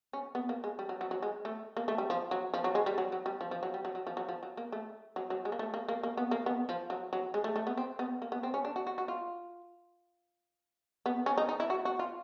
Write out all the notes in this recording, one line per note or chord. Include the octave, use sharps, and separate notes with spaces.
C#4
B3
A#3
G#3
G3
F#3
F#3
F#3
G#3
A3
A#3
A3
G3
F3
F#3
F3
F#3
G#3
G3
F#3
F#3
G3
F3
F3
F#3
G3
F#3
F#3
F3
F#3
F3
F#3
A#3
A3
F#3
F#3
G#3
A#3
A3
A#3
A#3
A#3
B3
A#3
B3
F3
F#3
F#3
G#3
A3
A3
B3
C4
B3
A#3
B3
C4
C#4
D4
F#4
F#4
F#4
F4
B3
C#4
D#4
D#4
E4
F#4
F#4
F4